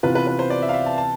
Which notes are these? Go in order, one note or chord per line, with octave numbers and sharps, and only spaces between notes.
C3 E3 B3 F4 B4
B4
B4
C5
D5
E5
F5
E5
A5
A5